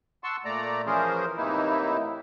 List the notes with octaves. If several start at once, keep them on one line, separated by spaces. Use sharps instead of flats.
F#5 A5 C6 C#6 E6
A#2 A3 D5 A#5
E3 F3 C#4 G#4 A#4 C5
A2 C3 E3 A#3 D#4 E4